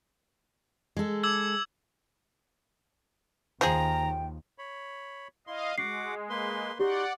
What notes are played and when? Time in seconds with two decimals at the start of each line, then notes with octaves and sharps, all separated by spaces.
0.97 G#3 A4
1.23 D6 E6 G#6
3.61 D#2 D#3 F3 G#4 G5 A#5
4.58 C#5 B5
5.47 E4 D#5 F5 C6
5.78 G#3 F#4 F#5 D6 C7
6.30 A#3 B4 C6
6.80 D#4 F#4 G4 D5 F#5 C6